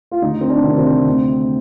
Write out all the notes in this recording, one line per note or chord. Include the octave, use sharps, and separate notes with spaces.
F4
D2 D#4
C4
D4
C3 D#3
C4
D2